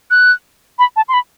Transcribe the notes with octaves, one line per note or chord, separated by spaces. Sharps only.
F#6
B5
A5
C6
B5